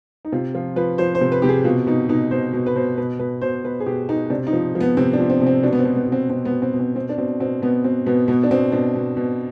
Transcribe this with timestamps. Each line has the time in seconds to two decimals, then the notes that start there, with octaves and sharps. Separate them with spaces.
0.25 D#4
0.32 C3 F4
0.54 F3 F4
0.76 F3 B4
0.98 F3 C5
1.15 C5
1.21 C3
1.32 B4
1.42 C3 G4
1.49 G#4
1.64 B2 F4
1.87 B2 D#4
2.09 B2 D#4
2.31 B2 C5
2.53 B2
2.66 B4
2.76 B2 C5
2.98 B2 B4
3.19 B2 B4
3.41 B2 C5
3.64 B2 B4
3.80 G#4
3.86 B2 G4
4.08 B2 D#4
4.30 C3 D4
4.47 D#4
4.53 F3
4.75 F3
4.80 B3
4.97 C3 C4
5.13 D4
5.19 F3
5.30 C4
5.41 C3 C4
5.63 B2 D4
5.73 B3
5.79 C4
5.85 B2
5.96 B3
6.07 B2
6.12 C4
6.29 B2 C4
6.45 B3
6.51 B2
6.62 C4
6.73 B2
6.80 C4
6.95 B2 C4
7.09 D4
7.18 B2 C4
7.40 B2 C4
7.62 B2 B3
7.84 B2 C4
8.06 B2 B3
8.28 B2 B3
8.43 D4
8.51 B2 C4
8.72 B2 D4
8.95 B2
9.17 B2